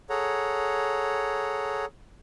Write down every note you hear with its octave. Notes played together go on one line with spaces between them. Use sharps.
G#4 A4 C#5 F#5 A#5